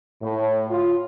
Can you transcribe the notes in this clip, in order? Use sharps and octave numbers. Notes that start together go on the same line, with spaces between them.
A2
F4